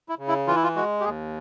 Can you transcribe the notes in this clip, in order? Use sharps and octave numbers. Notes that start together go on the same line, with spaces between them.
E4
C#3
E4
E3 F4
E4
F4
G#3 F#4
G4
D#2 G#4